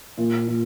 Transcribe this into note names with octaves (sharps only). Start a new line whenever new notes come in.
A#2
A#2